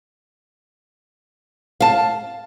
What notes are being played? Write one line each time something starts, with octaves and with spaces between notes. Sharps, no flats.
F5 A5